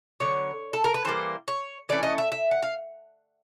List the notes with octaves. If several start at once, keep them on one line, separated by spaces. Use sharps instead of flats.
D3 F#3 B3 C#5
A4
A#4
B4
E3 G3 A#3 C5
C#5
E3 A3 C#4 D5
D#5
E5
E5
F#5
F5